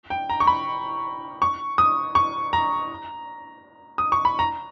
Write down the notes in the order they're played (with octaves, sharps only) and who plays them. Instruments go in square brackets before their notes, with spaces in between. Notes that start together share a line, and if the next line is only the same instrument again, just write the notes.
[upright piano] G5
A#5
C#6
B5
C#6
D#6
C#6
A#5
D#6
C#6
B5
A#5